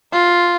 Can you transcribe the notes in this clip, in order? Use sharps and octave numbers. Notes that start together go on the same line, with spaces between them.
F4